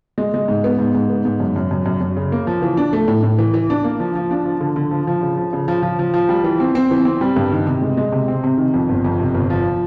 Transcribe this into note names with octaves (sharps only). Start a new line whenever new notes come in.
G#3
G#3
G#2
B3
G#2
G#2
B3
G#2
F#2
F#2
F#2
F#2
F#2
C#3
A#3
F3
E3
D4
A3
A2
A2
E3
E3
D4
A#3
F3
F3
D4
F3
D3
D3
F3
F3
C#3
F3
C#3
F3
F3
F3
F3
G3
E3
C4
C4
E3
C4
G3
G2
D#3
C3
G#3
G#3
C3
C4
C3
D#3
F2
G1
F2
C3
G1
F3